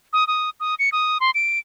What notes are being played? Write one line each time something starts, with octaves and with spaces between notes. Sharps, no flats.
D#6
D#6
D#6
C#7
D#6
C6
D7